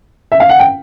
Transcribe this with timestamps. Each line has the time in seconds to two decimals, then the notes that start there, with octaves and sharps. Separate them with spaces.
0.32 E5
0.40 F5
0.49 F#5
0.59 G5